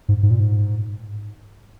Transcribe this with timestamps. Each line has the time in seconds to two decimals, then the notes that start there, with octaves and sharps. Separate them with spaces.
0.09 G#2
0.23 G#2
0.31 A#2
0.40 G#2